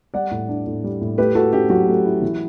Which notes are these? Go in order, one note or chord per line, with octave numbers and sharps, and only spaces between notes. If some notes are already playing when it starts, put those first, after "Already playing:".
G3 D5 F#5
A2
D4
A2
G3
A2
A3 G4 B4
E4 F#4 A4
C#4 G4
F#3 F#4
A3
E4
E3